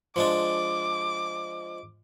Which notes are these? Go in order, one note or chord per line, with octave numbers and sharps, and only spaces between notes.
F3 G#3 D4 D6